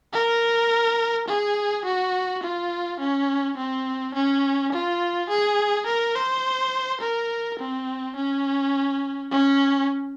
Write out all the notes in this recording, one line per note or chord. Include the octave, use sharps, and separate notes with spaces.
A#4
G#4
F#4
F4
C#4
C4
C#4
F4
G#4
A#4
C5
A#4
C4
C#4
C#4